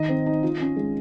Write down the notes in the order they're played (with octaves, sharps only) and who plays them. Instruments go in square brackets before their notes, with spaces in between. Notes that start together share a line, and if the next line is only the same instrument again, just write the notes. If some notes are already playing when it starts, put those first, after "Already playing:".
Already playing: [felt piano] D#3 D#4 [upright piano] D#5
[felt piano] C4
D#4
F4
C#4
G#3